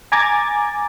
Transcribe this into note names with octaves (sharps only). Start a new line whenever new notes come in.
G#5 A#5 D6 G#6 A6